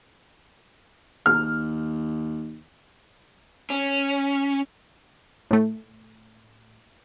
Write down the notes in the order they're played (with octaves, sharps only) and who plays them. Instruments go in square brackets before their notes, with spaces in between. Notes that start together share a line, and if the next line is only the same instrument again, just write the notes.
[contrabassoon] D#2 [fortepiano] F6
[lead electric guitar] C#4
[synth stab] A2 A3